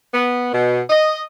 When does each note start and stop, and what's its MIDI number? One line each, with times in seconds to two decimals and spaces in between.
0.14 0.50 59
0.53 0.81 47
0.90 1.21 75